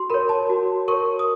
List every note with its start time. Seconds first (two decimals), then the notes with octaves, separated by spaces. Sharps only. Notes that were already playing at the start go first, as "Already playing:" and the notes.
Already playing: F#4 C6
0.10 A#4 C#5 B5
0.29 A5
0.50 F#4
0.88 A#4 C#5 C#6
1.19 D#6